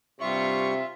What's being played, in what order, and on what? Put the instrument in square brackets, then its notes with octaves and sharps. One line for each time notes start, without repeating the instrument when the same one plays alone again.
[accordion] G2 C#6 [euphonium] C3 [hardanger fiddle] F4 [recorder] E5